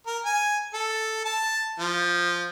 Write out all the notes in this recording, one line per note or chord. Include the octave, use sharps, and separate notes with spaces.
A#4
G#5
A4
A5
F3